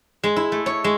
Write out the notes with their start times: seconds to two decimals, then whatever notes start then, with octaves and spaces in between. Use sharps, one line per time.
0.23 G#3
0.36 E4
0.52 A3
0.66 C#5
0.84 G#3